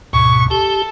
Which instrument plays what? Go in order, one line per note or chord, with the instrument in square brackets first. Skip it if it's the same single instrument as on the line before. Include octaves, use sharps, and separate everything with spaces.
[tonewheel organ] D2 G#2 B2 [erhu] C#6
[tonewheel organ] G4 [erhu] A4